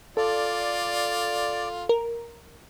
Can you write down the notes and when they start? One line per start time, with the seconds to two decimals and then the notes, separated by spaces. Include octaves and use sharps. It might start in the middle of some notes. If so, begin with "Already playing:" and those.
0.17 F4 A4 D5
1.89 A#4